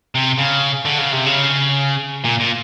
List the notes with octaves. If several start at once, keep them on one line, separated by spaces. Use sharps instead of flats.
C3
C#3
D3
C#3
C3
C#3
A#2
A#2